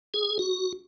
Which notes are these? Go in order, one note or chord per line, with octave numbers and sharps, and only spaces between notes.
G#4
F#4